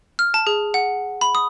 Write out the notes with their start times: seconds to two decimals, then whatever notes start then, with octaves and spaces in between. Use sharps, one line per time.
0.19 F6
0.34 A5
0.47 G#4
0.74 F#5
1.21 B5
1.35 D#6